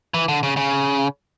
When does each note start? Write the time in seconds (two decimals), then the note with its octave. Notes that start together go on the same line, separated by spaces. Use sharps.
0.14 E3
0.28 D3
0.43 C#3
0.57 C#3